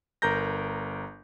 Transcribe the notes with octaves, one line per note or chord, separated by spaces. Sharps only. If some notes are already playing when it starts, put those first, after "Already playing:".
G1 A#4 A#5 G6 A#6